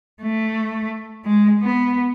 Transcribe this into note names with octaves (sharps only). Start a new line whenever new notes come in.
A3
G#3
B3